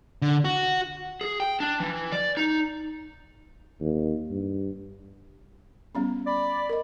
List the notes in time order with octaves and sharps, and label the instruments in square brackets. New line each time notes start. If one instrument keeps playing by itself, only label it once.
[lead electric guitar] D3
F#4
G#4
G5
D4
E3
D5
D#4
[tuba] D#2
G2
[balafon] G3 B3 C#4
[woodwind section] D5 B5
[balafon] A#4 D#5